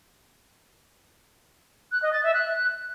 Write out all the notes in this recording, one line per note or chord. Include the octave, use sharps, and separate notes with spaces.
F#6
D#5
A6
E5
F#6